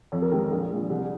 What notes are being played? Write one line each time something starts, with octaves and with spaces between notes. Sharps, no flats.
F2 C#5
A#4
D#3 G#3 G4
A#1
A#2 G#3
C2 G#4